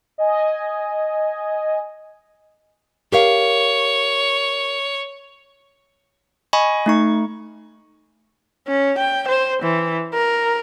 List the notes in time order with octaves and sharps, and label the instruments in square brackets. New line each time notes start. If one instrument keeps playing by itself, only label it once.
[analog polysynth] D#5 G#5
[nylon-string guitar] G4 A#4 F5 [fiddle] C#5
[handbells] D#5 G#5 B5 C#6
A3 D#4 C#6
[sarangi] C#4
G5
C5
E3
A#4